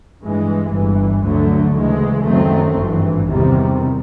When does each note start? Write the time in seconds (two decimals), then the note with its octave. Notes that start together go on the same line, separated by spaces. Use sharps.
0.20 G2 E3 G#3
0.72 G1 G2 E3
1.23 D2 D3 F#3 A3
1.74 D2 C#3 E3 G#3
2.25 F#2 D#3 F#3 A3 C4
2.77 G#1 G2 E3
3.28 E2 C3 D#3 G3